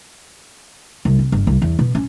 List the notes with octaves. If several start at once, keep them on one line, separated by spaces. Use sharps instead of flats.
C2
C3
G1
C2
E2
B2
C#4